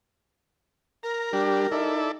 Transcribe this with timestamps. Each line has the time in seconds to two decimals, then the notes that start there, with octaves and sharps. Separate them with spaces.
1.03 A#4 A#5
1.33 G3 D4 G4
1.71 D#4 E4 A4 D5